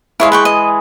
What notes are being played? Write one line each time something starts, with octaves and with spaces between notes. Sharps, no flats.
E3 G#3 E4 G#4 C#5 F5
B4 G5 C#6
D#5